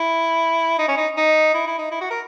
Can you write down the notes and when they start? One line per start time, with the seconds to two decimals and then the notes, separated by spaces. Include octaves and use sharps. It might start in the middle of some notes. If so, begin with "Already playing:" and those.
Already playing: E4
0.79 D#4
0.88 C#4
0.97 D#4
1.17 D#4
1.54 E4
1.67 E4
1.78 D#4
1.92 E4
2.01 F#4
2.10 A#4